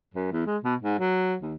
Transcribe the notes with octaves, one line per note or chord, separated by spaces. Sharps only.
F#2
E2
G#3
B2
G#2
F#3
D#2